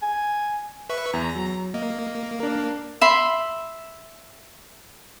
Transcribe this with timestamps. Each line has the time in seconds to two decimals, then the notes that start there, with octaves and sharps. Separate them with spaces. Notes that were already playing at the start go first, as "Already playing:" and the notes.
0.02 G#5
0.90 B4 E5 C#6
1.13 E2 A#5
1.35 F#3
1.74 A#3 D#5
2.40 D4 A#4
3.01 E5 B5 C6